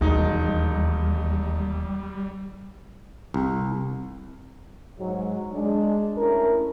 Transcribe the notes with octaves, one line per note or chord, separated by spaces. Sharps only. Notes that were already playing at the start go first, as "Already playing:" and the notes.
E1 D#2 G3 D#4
C2
G#2 F#3
G#3 D4
A3 C#4 E4 A#4